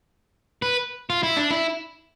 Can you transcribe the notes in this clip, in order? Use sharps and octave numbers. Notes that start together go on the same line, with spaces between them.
B4
F4
E4
D4
E4